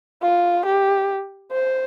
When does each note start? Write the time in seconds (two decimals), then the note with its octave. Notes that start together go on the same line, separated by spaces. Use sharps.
0.22 F4
0.65 G4
1.52 C5